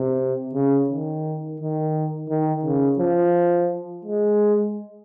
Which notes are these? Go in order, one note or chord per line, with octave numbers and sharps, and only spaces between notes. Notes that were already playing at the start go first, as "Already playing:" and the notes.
Already playing: C3
C#3
D#3
D#3
D#3
C#3
F3
G#3